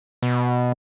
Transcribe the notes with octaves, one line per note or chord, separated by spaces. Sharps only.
B2